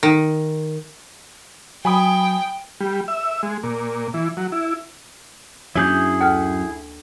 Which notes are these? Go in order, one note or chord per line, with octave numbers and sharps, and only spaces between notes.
D#3
F#3 G5 G#5 B5 D#6
G3
E5
G#3
A#2
E3
F#3
E4
F#2 F#3 A#3 D4 E4 G#4 G6
D2 A4 F6